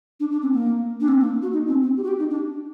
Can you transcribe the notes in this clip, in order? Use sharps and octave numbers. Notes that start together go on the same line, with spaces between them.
D4
D4
C4
A#3
D4
C4
A#3
F#4
D#4
C4
C4
G4
F#4
G4
D#4
D4